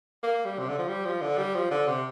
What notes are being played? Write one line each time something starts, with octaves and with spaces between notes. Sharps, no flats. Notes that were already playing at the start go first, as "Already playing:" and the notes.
A#3
G3
C3
D3
F3
G3
F3
D3
G3
F3
D3
C3